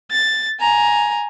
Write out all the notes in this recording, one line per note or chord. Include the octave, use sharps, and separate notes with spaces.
A6
G#5 A#5